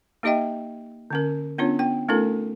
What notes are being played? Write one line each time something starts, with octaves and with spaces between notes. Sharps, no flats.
A#3 D#4 G4 D#5 E5 G5
D3 C#4 A#4
B3 C#4 D4 F4 C#5
B3 G5
A3 C#4 D#4 F4 A4 A#4